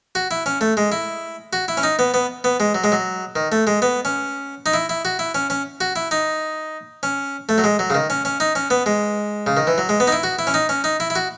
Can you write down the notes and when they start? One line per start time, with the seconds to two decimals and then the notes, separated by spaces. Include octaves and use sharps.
0.15 F#4
0.31 E4
0.46 C#4
0.61 A3
0.77 G#3
0.92 E4
1.53 F#4
1.68 E4
1.77 C#4
1.83 D#4
1.99 B3
2.14 B3
2.44 B3
2.60 G#3
2.75 F#3
2.84 G#3
2.92 F#3
3.36 D#3
3.52 A3
3.67 G#3
3.82 B3
4.05 C#4
4.66 D#4
4.74 E4
4.89 E4
5.05 F#4
5.19 E4
5.35 C#4
5.50 C#4
5.81 F#4
5.96 E4
6.11 D#4
7.03 C#4
7.49 A3
7.58 F#3
7.64 G#3
7.79 F#3
7.90 C#3
7.94 D#3
8.10 C#4
8.25 C#4
8.40 D#4
8.55 C#4
8.70 B3
8.86 G#3
9.47 C#3
9.57 D#3
9.67 E3
9.78 F#3
9.89 G#3
10.00 B3
10.07 D#4
10.12 E4
10.23 F#4
10.39 E4
10.47 C#4
10.54 D#4
10.69 C#4
10.84 D#4
11.00 E4
11.10 E4
11.15 F#4